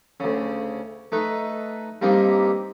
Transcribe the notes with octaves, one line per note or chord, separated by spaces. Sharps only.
D2 C#3
A3 D#4 B4
G2 G3 A#3 C4 D#4